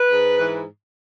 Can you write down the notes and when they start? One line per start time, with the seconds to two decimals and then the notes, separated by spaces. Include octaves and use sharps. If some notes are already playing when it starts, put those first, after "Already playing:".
Already playing: B4
0.11 G#2
0.39 E3